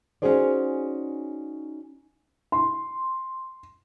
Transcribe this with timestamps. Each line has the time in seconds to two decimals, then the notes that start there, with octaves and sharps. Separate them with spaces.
0.22 C#4 D#4 F#4 G#4 C5 D5
2.52 C6